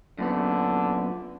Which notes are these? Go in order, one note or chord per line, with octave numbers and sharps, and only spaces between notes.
F#2 A#2 D3 B3